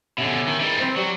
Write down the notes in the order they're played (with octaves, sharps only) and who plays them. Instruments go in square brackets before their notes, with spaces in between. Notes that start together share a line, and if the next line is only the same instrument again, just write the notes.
[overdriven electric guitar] B2 D3 [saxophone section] C#4 G4 E5
[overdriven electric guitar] D#3
[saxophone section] D#3 G#3 [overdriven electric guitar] E3 G3
[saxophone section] C4
[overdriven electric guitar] F#3 [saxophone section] G3